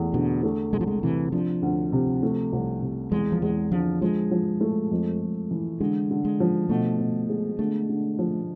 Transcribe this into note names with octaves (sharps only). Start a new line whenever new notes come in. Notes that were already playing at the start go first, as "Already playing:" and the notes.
Already playing: E2 A3
B2 D3
A3
C2 G#3
F3
G#3
C3 E3
F3 D4
D2
C3
A3
C2
C3
E2 G#3
F3
E2 G#3
D3 F3
F3 G#3
F3
A3
F2
F2
E3
D3 G#3
D3
G#3
F3
B2 A3
B2
G#3
D3 A3
D3
F3